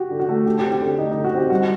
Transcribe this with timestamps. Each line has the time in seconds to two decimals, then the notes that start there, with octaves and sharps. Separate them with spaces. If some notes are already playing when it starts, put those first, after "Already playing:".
Already playing: F#4 G4
0.10 D3
0.20 F#4
0.29 A3
0.46 D3 G4
0.59 G4
0.64 C4
0.72 G4
0.81 D3
0.98 A3 D#4
1.12 D3 D#4
1.24 F#4
1.33 C4 G4
1.50 G3 F#4